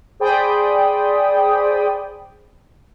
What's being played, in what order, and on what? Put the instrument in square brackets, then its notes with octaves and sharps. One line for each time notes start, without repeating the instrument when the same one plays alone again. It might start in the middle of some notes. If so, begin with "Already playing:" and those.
[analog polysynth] G#4 C5 D5 G5 B5 D#6